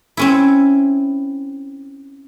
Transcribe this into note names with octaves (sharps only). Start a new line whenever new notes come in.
C4 C#4 E4